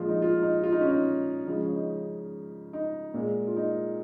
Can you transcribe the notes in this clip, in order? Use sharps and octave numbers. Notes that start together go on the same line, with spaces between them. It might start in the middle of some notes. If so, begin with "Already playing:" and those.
Already playing: A#2 F3 G#3 F4
D#4
F4
D#4
F4
D#4
C#4
D#4
C#3 F3 G#3 D#4
C#4
D#4
D#4
A#2 G#3
F4
D#4